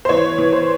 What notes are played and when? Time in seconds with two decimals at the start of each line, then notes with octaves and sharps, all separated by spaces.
0.05 C5
0.09 E3 C#5
0.38 E3
0.53 C5